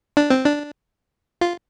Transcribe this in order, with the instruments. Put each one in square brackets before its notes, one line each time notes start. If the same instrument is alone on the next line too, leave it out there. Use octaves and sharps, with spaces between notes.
[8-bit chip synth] D4
C4
D4
F4